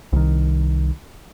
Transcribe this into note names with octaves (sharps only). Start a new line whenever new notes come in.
C2 D#3